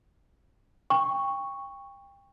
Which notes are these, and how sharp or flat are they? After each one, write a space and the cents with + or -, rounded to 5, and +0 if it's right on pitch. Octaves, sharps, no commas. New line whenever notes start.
G5 +30 C#6 +0